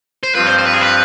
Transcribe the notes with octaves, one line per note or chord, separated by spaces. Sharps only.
C5
G2 F3 C4 F4 B4
C5
C5
B4
G#4
B4